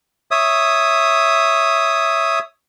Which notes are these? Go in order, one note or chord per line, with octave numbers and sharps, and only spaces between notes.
C#5 E5 D#6